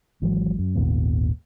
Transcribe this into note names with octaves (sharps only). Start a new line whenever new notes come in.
G#1 G#2 E3 F#3
F#2
G#1 D#2 A#2 B3